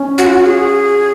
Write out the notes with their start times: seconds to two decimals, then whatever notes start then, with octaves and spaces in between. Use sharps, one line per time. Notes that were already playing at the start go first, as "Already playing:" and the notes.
Already playing: C#4
0.18 F#4
0.27 F4
0.33 F#4
0.46 G#4